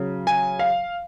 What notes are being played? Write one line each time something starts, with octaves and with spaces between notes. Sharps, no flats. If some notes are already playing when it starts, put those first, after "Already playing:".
Already playing: C#3 F#3
G#5
F5